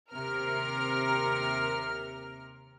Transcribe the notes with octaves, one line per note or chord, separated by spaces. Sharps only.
D#2 C3 A#4 F6